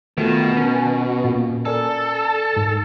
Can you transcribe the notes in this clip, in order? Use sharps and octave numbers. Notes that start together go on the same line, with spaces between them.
B2 D#3 A3 F4 F#4
C#4 A#4
A#2 A#3
A4 A#4 D5 G#5
G#2